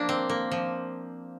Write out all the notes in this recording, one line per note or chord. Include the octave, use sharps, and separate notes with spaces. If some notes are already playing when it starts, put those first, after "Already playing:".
Already playing: F3 A#3 D4
C4
A#3
F3